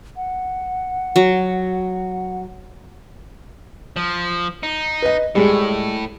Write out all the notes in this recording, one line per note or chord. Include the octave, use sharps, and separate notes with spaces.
F#5
F#3
F3
D#4
B4 D#5
A2 G3 G#3 G#4